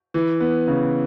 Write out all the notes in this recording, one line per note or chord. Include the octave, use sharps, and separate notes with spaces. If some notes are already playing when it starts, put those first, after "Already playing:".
E3
B3
C#3